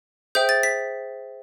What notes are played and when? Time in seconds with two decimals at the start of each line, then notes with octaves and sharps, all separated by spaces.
0.35 G#4 C5 E5 G5 G6
0.49 A6
0.63 B6